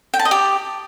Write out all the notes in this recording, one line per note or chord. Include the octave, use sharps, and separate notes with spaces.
G5
A5
D#5
G4